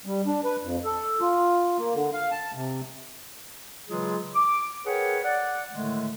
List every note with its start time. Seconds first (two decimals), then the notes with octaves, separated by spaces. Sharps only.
0.06 G3
0.26 D4
0.44 B4
0.63 F2
0.85 A4
1.21 F4
1.78 A#3
1.94 D3
2.13 F5
2.31 A5
2.54 C3
3.88 C#3 E3 F#3 G#3 F4 G#4
4.35 D6
4.86 G#4 A#4 B4 C#5 F#5 G5
5.24 D5 F#5
5.72 A2 D3 D#3 G#3 A3